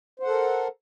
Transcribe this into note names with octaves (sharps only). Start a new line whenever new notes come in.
A4 A#4 C5 F#5